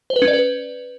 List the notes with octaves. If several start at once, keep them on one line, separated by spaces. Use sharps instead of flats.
C5
B4
C#4
D5
B4